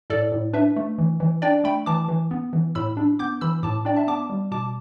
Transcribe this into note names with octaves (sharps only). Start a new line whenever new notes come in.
A2 A4 D5
A2
D4 B4 E5
A3
E3
E3
D4 D5 G5
A3 G5 B5
E3 A5 D6
E3
B3
E3
A2 B5 E6
D4
B3 D6 G6
E3 B5 E6
A2 A5 D6
D4 D5 G5
E5 A5
B3 A5 D6
G3
B2 A5 D6